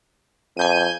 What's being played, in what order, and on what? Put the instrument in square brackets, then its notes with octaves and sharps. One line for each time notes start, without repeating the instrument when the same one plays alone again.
[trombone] F2 [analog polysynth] G#5 G6 D#7